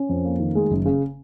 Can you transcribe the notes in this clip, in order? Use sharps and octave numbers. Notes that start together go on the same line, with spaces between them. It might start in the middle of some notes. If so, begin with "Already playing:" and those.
Already playing: C#4
F2
A#3
D#3
G#3
F#1
C#3